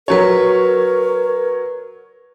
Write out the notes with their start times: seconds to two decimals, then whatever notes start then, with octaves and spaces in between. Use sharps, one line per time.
0.08 F#3 A#4 B4 C#5 C#6